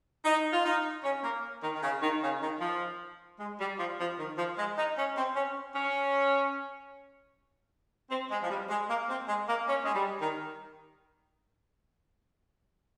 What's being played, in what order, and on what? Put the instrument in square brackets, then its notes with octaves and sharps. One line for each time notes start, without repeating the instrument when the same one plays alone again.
[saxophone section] D#4
F4
D#4
C#4
A#3
D#3
D#3
C#3
D#3
C#3
D#3
F3
G#3
G3
F3
F3
D#3
F3
G#3
D#4
C#4
C4
C#4
C#4
C4
G#3
F3
G3
G#3
A#3
C4
G#3
A#3
C#4
G#3
G3
D#3